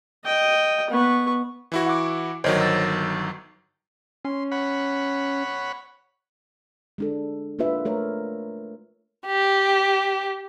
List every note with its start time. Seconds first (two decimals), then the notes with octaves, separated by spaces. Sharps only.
0.25 D#5 G5
0.90 B3 C#6
1.72 E3 E4 F#4
1.86 F#5 D6
2.44 G1 D#3 F#3 C5 C#5 D#5
2.61 E6 A6
4.25 C#4 C6
4.52 C#5 F#5 B5
6.98 G#3 D4 A4
7.59 A#3 D4 F4 B4 E5
7.85 A3 A#4 C#5
9.26 G4